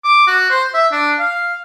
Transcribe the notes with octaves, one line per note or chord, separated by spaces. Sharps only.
D6
F#4
C5
E5
D4
F5